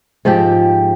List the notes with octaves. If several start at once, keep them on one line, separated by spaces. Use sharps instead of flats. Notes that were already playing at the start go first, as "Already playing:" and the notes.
G#2 F3 C4 G4